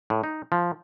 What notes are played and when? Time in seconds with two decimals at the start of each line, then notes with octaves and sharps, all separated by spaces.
0.10 A2
0.24 D#4
0.52 F3